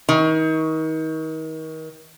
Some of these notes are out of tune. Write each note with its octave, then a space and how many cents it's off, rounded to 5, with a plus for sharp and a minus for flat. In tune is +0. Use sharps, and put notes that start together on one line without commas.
D#3 +35